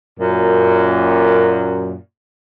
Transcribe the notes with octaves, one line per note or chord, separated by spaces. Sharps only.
F#2 A#2